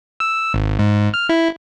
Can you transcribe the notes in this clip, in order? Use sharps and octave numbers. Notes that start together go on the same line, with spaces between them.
E6
G#1
G#2
F6
E4